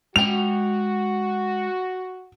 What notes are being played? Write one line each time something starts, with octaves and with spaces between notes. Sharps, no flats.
G#3 F#4 G5 F7